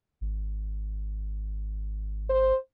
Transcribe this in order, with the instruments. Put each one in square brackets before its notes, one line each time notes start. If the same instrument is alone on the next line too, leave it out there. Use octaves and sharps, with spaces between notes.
[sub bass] G#1
[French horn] C5